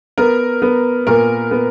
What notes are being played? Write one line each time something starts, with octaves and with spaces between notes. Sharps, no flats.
B3 A#4
B3
A#2 A#4
B3